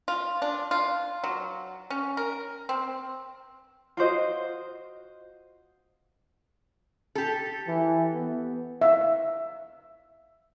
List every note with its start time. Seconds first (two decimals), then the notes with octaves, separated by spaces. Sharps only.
0.08 F4
0.42 D4
0.71 F4
1.24 F#3
1.90 C#4
2.17 A#4
2.69 C4
3.97 F4 F#4 C5 D#5
7.15 G4 A4
7.67 E3
8.14 B3
8.81 E5 F5